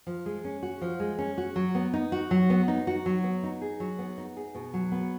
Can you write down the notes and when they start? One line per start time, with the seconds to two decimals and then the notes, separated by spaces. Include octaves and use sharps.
0.07 F3
0.26 G#3
0.44 C#4
0.62 F#4
0.81 F3
1.00 G#3
1.18 C#4
1.38 F#4
1.56 F#3
1.75 B3
1.93 D#4
2.12 F#4
2.31 F#3
2.50 B3
2.68 D#4
2.87 F#4
3.06 F#3
3.24 B3
3.43 D#4
3.61 G#4
3.80 F#3
3.99 B3
4.18 D#4
4.37 G#4
4.55 B2
4.73 F#3
4.92 B3